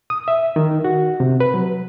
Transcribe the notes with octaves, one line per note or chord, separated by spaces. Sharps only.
D#6
E5
D#3
F#4
C3
B4
F#3